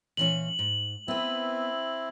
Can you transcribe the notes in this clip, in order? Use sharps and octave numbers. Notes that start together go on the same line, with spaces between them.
A#2 E3 C#4 F#7
G#2
B3 C4 E4 B4